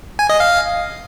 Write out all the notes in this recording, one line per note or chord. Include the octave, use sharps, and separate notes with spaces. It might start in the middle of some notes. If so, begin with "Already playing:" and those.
G#5
D#5
F5